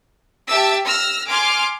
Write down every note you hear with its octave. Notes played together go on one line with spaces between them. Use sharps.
G4 E5 A5 D6 E6
E6 F6 A#6
G#5 C6 D6 F6